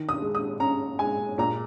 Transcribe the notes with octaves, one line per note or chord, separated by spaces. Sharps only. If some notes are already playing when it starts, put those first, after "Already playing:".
Already playing: D#3
D#6
G#3
D#6
C#4 A#5
G#3 G#5
A#2 A#5